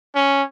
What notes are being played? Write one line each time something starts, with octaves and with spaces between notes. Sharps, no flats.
C#4